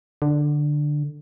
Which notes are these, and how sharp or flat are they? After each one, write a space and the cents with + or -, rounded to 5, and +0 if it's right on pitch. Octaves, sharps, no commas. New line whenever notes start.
D3 +10